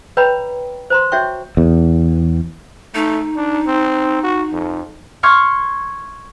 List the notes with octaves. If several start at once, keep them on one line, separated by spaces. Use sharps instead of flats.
B4 C#5 D#5 G5 A#5 B5
C5 A#5 C6
F#4 C#5 E5 G5 C#6
E2
A3 D#4
D4
C4
F#4
F2
C6 C#6 F6 G#6